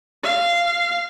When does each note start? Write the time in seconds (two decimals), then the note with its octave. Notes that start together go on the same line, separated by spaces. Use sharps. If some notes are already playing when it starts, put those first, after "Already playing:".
0.23 F5